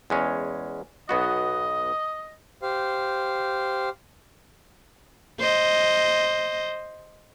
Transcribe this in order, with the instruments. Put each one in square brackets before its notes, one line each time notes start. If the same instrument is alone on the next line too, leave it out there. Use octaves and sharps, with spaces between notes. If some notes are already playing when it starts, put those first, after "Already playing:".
[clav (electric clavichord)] E2 G#3 C#4
[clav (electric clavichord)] B1 B3 F#4 [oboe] D#5
[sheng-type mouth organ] G4 C5 F5
[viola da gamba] C5 D#5